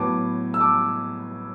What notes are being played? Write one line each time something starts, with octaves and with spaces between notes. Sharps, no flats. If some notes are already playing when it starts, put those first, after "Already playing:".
Already playing: A2 F#3 B3 A5 D6
E6
A5 D6